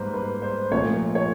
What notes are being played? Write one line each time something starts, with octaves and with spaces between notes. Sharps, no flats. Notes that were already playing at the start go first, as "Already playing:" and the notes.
Already playing: G#2 G3 A#3 B4 C5
B4
C5
A#2 F3 A3 C#5
C#5